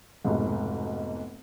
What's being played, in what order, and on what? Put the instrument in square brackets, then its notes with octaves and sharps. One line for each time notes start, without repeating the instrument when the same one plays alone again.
[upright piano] F1 B1 G#2